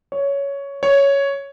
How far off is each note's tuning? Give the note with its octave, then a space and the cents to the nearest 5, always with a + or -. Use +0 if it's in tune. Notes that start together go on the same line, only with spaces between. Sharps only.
C#5 +10
C#5 +5